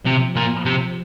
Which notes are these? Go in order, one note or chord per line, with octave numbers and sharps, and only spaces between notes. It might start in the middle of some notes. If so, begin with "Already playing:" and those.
C3 F3
F3
A#2
C3